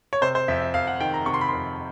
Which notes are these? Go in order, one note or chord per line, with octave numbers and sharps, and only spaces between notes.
C#5
C3 C5
C5
F2 E5
E5
F2 F5
F#5
D#3 G5
A#5
C3 C#6
C6
B5
F2 C6